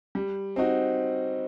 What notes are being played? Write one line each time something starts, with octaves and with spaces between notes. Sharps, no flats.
G3
C4 D#4 F#4